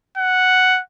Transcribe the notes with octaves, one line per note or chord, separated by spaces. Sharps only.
F#5